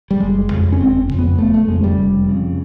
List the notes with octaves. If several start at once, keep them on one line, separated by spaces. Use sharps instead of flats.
G3
F#1 G#3
F2 C#3
C#4
F#1 C4
F2 C#3
B3
F1 A3
A3
F2 C#3 G#3
G3
F1
F2 C#3